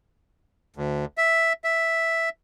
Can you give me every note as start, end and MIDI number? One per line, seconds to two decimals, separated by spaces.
0.76 1.05 38
1.18 1.53 76
1.64 2.29 76